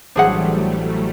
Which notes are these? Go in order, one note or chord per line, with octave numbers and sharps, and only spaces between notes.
A1 F#3 G3 A3 D4 G#4 C5 F#5